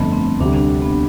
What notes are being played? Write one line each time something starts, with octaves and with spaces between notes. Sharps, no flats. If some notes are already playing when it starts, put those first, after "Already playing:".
Already playing: G1 F2 D3 A3 B3
C4
D2 C3 G3 D4
D4
B3